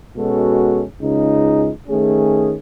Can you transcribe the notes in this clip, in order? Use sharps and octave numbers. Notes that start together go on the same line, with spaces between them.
B2 G#3 C#4 F#4 A4
C#2 C#3 G#3 D#4
D#3 A3 C#4 G#4